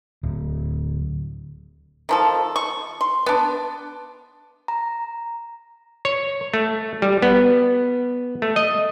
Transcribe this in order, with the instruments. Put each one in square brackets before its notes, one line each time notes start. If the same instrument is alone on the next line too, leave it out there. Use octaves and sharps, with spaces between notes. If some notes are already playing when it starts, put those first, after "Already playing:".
[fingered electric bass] D1
[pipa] D#3 F3 A4
C#6
C6
B3 D4
[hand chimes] A#5
[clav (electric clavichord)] C#5
A3
G3
B3
A3
D#5